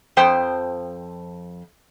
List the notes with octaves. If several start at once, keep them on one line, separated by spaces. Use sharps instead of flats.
F2 F3 C5 G5